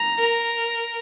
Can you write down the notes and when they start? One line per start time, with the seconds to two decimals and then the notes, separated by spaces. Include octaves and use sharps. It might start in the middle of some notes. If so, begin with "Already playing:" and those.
Already playing: A#5
0.19 A#4